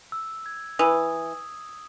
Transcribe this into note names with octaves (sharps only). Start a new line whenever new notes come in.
E6
G#6
E3 D#6